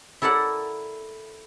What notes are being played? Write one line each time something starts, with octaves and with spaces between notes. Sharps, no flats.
E4 A4 A#4 D5 F#5